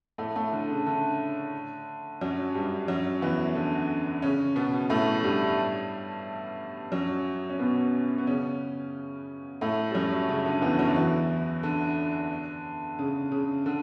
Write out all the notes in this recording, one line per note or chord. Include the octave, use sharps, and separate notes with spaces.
A2 A3
A2 A3
D3
C#3
D3
F#2 F#3
G2 G3
F#2 F#3
E2 E3
D3
C#3 C#4
B2 B3
A2 A3
G2 G3
F#2 F#3
C#4
B2 B3
B3
C#3 C#4
A2 A3
G3
F#2 F#3
C#3
D3
E2 E3
F#2 F#3
D3
E2 E3
D3
C#3
C#3
D3